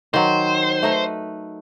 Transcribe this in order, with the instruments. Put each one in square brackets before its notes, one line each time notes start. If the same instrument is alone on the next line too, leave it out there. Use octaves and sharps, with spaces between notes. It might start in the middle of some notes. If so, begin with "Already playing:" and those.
[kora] D#3 F#3 [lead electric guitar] C5
[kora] A3 D#4 B4